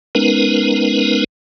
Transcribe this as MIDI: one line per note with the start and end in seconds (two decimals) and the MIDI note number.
0.15 1.24 56
0.15 1.24 59
0.15 1.24 61
0.15 1.24 63
0.15 1.24 70
0.15 1.24 71